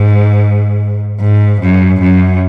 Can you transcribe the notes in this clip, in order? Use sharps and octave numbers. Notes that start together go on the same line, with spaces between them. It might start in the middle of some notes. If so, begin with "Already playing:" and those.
Already playing: G#2
G#2
F#2
F#2